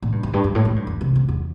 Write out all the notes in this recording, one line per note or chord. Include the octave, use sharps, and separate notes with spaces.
A#2
G2
F2
G2
G2
A2
A2
G2
F2
C3
F2
E2